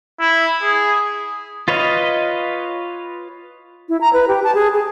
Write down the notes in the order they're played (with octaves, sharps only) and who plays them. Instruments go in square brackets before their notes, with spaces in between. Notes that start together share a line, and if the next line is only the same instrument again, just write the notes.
[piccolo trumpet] E4
G#4
[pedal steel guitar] F4 B4 C#5 D#5 F5
[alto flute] E4
A#5
B4
G4
A5
G#4
G#4